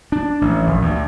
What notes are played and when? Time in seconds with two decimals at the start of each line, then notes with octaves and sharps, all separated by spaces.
0.12 D4
0.41 A1
0.67 A#1
0.82 D2